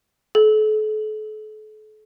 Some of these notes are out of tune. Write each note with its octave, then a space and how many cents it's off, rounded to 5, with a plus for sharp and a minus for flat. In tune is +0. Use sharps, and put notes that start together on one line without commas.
A4 -40